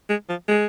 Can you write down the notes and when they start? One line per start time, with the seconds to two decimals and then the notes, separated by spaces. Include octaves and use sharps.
0.10 G#3
0.29 F3
0.48 G#3